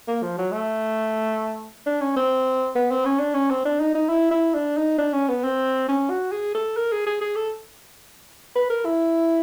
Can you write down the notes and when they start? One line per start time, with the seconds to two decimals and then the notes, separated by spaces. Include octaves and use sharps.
0.08 A#3
0.23 F3
0.38 F#3
0.52 A3
1.86 D4
2.01 C#4
2.16 C4
2.76 B3
2.91 C4
3.05 C#4
3.20 D4
3.34 C#4
3.50 C4
3.65 D4
3.80 D#4
3.95 D#4
4.09 E4
4.31 E4
4.54 D4
4.77 D#4
4.99 D4
5.13 C#4
5.29 B3
5.44 C4
5.88 C#4
6.10 F#4
6.32 G#4
6.55 A4
6.77 A#4
6.92 G#4
7.07 G#4
7.21 G#4
7.36 A4
8.56 B4
8.70 A#4
8.85 E4